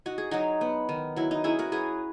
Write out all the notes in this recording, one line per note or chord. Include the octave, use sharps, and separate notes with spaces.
D#4 F#4
G#4
F#3 D#4 F#4
B3
D#3
F#3 E4
D#4
C#4 E4 G#4
F#4 A#4
F#3 G#4 B4